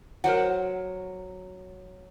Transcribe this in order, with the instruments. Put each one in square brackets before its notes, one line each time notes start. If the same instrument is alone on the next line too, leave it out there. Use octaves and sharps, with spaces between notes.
[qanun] F#3 [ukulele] A#4 C5 F#5